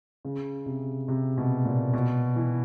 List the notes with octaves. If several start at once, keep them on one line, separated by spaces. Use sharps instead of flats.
C#3
C3
C3
B2
A#2
B2
E3